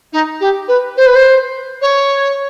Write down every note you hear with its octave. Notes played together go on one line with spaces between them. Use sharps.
D#4
G4
B4
C5
B4
C5
C#5